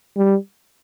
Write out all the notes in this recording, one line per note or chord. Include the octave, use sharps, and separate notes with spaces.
G3